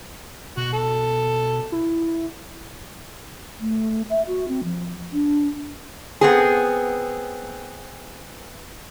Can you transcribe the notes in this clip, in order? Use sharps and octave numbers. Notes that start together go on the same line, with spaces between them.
B2 F#4
A4
E4
A3
E5
F#4
C4
F3
D4
B3 C4 G#4